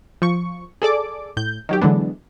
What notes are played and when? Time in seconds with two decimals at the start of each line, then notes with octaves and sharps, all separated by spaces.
0.22 F3 C#6
0.82 G#4 A4 D5 D6
1.37 A2 G6
1.69 D#3 F#3 G4
1.81 D3 E3 F#3 G#3 B3 D4